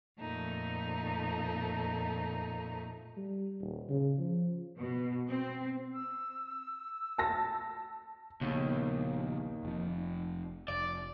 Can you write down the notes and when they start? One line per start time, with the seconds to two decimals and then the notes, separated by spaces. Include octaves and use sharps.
0.20 F2 A#2 A3 D#4
3.17 G3
3.61 D#1
3.90 C#3
4.18 F3
4.77 B2
5.27 C4
5.93 E6
7.18 A5 A#6
8.41 A#1 D#2 C#3 B3
9.63 F1 F3
10.68 F1 D5